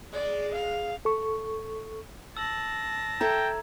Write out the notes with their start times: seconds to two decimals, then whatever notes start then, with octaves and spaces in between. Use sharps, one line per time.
0.13 G#3 D5
0.56 F5
1.05 A4 C#6
2.37 A5 E6 A#6 F#7
3.21 A4 E5 G5 A#5 G#6